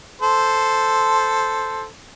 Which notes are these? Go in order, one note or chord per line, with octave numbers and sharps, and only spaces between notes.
A4 C5